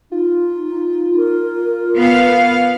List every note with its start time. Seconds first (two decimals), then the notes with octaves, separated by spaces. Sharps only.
0.12 D#4 F4
1.17 A#4
1.97 B3 F5